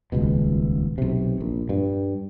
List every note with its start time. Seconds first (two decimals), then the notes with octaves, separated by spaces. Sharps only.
0.12 D#1 C#2 B2
0.98 B1 C3
1.40 A#1
1.69 G2